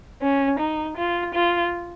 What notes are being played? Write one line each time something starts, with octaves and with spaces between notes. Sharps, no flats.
C#4
D#4
F4
F4